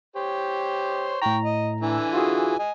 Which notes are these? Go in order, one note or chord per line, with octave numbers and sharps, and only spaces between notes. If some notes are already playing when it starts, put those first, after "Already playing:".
G4 C5 C#5
A2 G5 A#5 C#6
D#5
D3 E3 G#5
F4 F#4 G#4
D#5 G#5